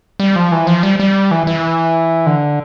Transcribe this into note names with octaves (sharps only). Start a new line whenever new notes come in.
G3
F3
E3
F3
G3
G3
E3
E3
D3